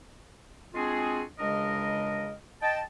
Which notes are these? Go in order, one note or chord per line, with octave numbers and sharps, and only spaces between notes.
G#3 C4 D4 F4 F#4 G#4
C#2 C#3 G#3 D4 A#4 D#5
D#5 G5 A5